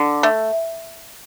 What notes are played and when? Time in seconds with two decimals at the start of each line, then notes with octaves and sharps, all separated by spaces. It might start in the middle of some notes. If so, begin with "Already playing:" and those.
Already playing: D3
0.23 A3